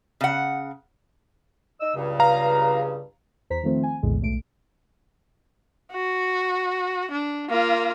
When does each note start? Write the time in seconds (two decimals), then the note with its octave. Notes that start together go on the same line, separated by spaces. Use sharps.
0.21 C#3 F#5
1.80 D#4 D#5 E6
1.95 C#2 G2 C#3
2.20 F5 A#5
3.50 E2 C5 A#5 B6
3.63 D#3 F3 A3 C4 C5
3.83 G#5
4.03 A#1 E2 A2 D3 G#3
4.22 B1 A3 D7
5.92 F#4
7.11 D4
7.49 A#3 F4